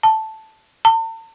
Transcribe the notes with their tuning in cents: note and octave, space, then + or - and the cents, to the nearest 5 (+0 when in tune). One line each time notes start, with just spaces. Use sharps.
A5 +0
A5 +40